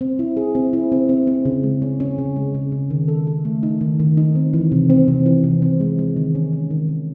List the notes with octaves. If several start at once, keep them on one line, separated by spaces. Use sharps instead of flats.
C4
E4
G#4
C4
E4
C4
C4
C4
C#3
G#3
C#4
C#4
C#3
G#3
C#3
C#3
D#3
A4
A4
A3
D#4
D#3
D#3
D#4
C4
E3
C3
C4
C3
E3
C3
C4
G#3
G#3
D#3
C#4
C#4
D#3
D#3